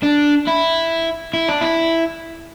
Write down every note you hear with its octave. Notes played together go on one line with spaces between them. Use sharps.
D4
E4
E4
D4
E4